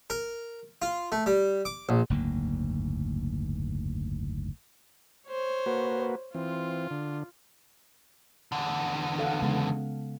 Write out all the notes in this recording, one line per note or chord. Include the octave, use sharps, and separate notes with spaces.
A#4
F4
A3
G3
D6
A#1
F#1 D2 G#2 A#3
C5 C#5
A#3 F#4 B4
E3 C4 F4
D3
E2 D3
A4 F5 F#5
C#3 G#3 B3